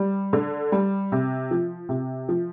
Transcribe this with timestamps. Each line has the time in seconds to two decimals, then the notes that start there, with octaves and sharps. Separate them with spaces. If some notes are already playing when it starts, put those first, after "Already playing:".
Already playing: G3
0.33 D3
0.72 G3
1.12 C3
1.51 F3
1.89 C3
2.29 F3